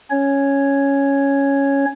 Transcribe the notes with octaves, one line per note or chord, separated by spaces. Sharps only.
C#4 C#5